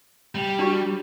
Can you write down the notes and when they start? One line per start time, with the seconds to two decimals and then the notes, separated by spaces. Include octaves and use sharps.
0.35 G3
0.59 D4 F#4 C#6